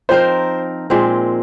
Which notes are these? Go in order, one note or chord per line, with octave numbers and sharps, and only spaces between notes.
F3 C4 D#4 A#4 C5
A#2 G#3 C4